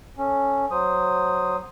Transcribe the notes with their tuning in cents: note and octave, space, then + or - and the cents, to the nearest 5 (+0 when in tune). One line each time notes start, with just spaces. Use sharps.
C#4 +0 A4 +0
F#3 +0 C5 +0 D#6 +0